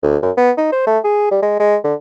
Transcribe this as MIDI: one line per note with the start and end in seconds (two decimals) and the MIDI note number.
0.03 0.17 38
0.23 0.31 42
0.37 0.51 59
0.57 0.70 63
0.72 0.85 72
0.87 0.99 57
1.04 1.29 68
1.31 1.39 55
1.42 1.55 56
1.60 1.76 56
1.84 1.94 50